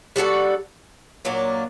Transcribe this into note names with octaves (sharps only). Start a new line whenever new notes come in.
G3 D4 F#4 A4
A#2 F#3 A#3 D4